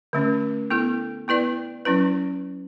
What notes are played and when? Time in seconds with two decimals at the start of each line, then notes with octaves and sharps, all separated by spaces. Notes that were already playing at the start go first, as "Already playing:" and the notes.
0.13 D3 A3 C#4
0.70 B3 E4 A4
1.28 B3 E4 B4 D5
1.85 F#3 C#4 E4 B4